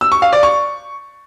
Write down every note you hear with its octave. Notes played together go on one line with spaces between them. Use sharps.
E6
C#6
F5
D5
C#6